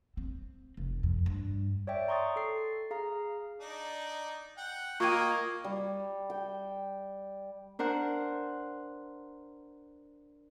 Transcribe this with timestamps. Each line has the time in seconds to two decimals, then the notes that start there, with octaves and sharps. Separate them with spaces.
0.17 C4
0.77 F1
1.03 F2
1.26 G2
1.87 C#5 D5 E5 G5
2.08 A#5 C6 C#6 D#6 A6
2.36 A4 C7
2.91 G#4 F5 A#5
3.60 D4 D#4
4.57 F#5 G5
5.00 A#3 F4 D#5 G5 C#6 G#6 D#7
5.64 G3
6.30 G5
7.79 D4 A#4 C5 F#5